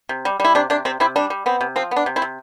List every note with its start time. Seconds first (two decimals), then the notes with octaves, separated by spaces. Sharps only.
0.09 C3
0.25 G3
0.40 G3 E4
0.55 C3 D4
0.70 C3 D4
0.85 C3 C4
1.00 C3 C4 E4
1.16 G3 D4
1.30 G3
1.46 B3 C4
1.61 C3
1.76 F3 C4
1.91 B3
1.96 D4
2.06 C3
2.16 C4 E4
2.22 C3